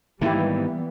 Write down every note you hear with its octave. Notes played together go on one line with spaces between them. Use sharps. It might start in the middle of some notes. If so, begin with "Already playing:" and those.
G#2 D#3 E3 G3 A#3 B3 E4 G4